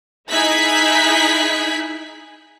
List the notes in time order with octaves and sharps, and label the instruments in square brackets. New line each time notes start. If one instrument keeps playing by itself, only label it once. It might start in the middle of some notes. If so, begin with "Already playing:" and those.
[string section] D#4 E4 G#4 F#6 G#6 B6